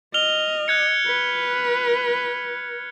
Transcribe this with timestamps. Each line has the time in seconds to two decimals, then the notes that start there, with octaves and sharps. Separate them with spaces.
0.14 D#5 F6 F7 G7
0.68 F#6 G#6 C#7
1.07 B4